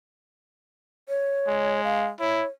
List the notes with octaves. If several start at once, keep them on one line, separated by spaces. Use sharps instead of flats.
C#5
G#3
F5
E4 C#5